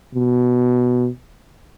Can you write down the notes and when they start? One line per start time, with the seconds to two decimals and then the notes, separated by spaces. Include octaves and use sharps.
0.15 B2